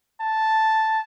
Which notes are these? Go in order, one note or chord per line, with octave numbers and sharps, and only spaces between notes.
A5